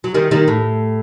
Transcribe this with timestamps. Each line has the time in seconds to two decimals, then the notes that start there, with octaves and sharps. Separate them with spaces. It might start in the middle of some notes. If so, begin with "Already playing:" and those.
0.04 F#3
0.14 D#3 G3
0.31 D#3 G3
0.48 A2